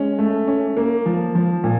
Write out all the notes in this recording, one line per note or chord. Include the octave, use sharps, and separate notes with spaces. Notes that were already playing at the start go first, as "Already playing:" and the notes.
Already playing: G#3 C#4
A3
C#4
A#3
F3
F3
A#2